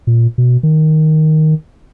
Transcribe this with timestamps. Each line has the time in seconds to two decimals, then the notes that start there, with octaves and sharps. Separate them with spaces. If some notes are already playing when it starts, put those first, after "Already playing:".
0.07 A#2
0.38 B2
0.63 D#3